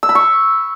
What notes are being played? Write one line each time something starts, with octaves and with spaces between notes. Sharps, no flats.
E6
B5
C#6